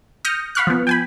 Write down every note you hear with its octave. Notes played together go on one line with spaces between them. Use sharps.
D#6 F6 G6 A#6 C#7
F5 F#5 B5 C#6 F6 F#6
F3 B3
G5 G#5 B5